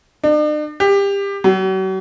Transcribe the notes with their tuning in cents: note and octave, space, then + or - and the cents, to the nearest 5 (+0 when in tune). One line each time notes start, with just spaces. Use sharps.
D4 +45
G4 +25
F#3 +40